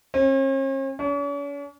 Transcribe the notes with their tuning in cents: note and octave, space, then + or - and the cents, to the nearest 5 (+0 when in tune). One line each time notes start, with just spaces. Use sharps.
C#4 -45
C#4 +45